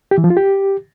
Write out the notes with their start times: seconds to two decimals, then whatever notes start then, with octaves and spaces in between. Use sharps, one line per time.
0.11 G4
0.18 E3
0.24 F3
0.30 F4
0.37 G4